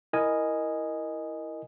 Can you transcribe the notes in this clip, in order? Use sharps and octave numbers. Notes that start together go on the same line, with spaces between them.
E4 A#4 D#5 G#5